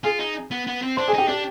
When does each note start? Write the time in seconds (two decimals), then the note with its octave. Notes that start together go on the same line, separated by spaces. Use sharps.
0.04 F4 G#4 G#5
0.19 D#4
0.51 B3
0.67 B3
0.82 C4
0.97 D4 C5 C6
1.08 G#4 G#5
1.14 D#4 G4 G5
1.28 D4 G4 G5